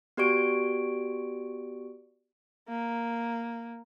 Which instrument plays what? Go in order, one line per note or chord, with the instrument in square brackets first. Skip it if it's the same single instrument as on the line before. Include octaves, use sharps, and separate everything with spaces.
[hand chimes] B3 F#4 G4 D5 C#6 D7
[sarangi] A#3